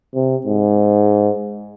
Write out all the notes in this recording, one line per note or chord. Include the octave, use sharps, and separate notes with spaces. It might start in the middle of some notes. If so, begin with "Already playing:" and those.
C3
G#2